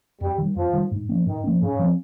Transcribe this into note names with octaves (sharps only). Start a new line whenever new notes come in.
F2 G3
D#3 G3
F2 F3
D#3 G3
G#2
F3 A#3 C#4
G#2 D#3
F3 A#3 C#4
G#2 C#3
F3 C4